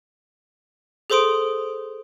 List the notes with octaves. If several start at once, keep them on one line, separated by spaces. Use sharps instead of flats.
G#4 A4 C5 C6 D#6 D7